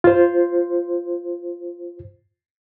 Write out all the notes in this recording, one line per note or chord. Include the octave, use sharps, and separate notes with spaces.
F4 C5